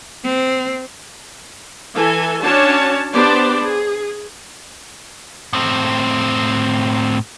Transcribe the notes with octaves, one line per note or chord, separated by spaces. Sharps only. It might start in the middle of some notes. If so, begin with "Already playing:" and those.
C4
E3 A4 G#5
C#4 D4 F#4 C#5 A5
B3 D4 G4 C5 D5
G#4
A2 C4